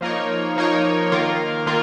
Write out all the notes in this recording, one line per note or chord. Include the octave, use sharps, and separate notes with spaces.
F3 A#3 D#4 A#4 C#5
F3 A#3 D#4 A#4 C#5
D#3 A#3 F4 A#4
D#3 A#3 F4